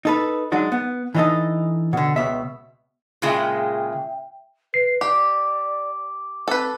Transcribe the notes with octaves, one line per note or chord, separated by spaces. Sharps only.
D#4 A4 B4
F#3 G#3 D4 D#4 F#4
B3
E3 D4 D#4 F#4 A4 D#5
B2 D3
C#2 B2 E5
A#2 C#3 G#3 E5 G5
B4 C7
G4 D5 D6
C4 A4 B4